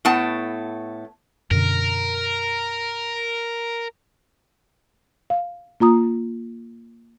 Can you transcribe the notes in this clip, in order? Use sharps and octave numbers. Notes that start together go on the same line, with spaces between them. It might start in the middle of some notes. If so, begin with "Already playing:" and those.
A2 A3 B3 A5
F#2 B2 D3 A#4
F5
A#3 F4 A#5 D#6